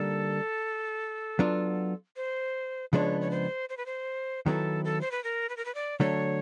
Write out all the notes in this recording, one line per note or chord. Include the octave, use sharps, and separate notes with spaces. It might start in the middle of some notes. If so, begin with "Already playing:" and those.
Already playing: D3 G3 A#3 D#4 A4
F#3 B3 D4 F4
C5
C#3 F3 G#3 B3 D4 C#5
C#5
C5
C5
B4
C5
D#3 F#3 B3 E4 A4
A4
C5
B4
A#4
B4
A#4
B4
D5
D3 F#3 A3 D4 C#5